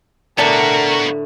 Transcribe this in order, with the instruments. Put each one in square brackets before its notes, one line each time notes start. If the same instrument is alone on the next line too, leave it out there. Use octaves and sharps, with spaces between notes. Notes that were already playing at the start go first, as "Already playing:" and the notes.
[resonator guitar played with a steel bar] A2 D5 A5 [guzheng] D3 A3 [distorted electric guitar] B3 F#4 [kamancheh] A#4